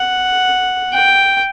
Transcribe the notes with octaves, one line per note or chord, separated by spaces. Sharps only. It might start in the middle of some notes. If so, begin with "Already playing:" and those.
Already playing: F#5
G5